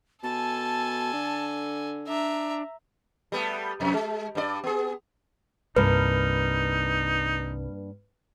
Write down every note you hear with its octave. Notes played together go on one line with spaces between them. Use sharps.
B2 A4 G#5 A5
D3
D4 E5 A#5
G3 A3 B3
F2 C3
G#3
G2 C4 D5
B3 G#4
C2 G2 A#3 D#4 B4